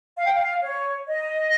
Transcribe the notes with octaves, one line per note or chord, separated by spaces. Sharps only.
F5
G5
F5
C#5
D#5